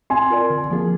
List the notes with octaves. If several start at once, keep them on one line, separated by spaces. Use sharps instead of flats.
C4 G#5 C6
F4 A#4 D5
D3
F3 A#3 F4 G#4